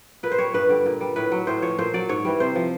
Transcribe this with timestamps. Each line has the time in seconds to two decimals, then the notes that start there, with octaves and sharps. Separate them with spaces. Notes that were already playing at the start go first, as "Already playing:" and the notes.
0.23 A#2 B4
0.32 C5
0.38 G3 C#5
0.54 G2 B4
0.69 D3 G3
0.86 A#2
1.01 G3
1.16 A2 B4
1.32 F#3
1.47 A2 C5
1.62 F3 C#5
1.79 A#2 C5
1.94 F#3 D5
2.09 G#2 C#5
2.25 E3 G3
2.40 C3 C5
2.55 F3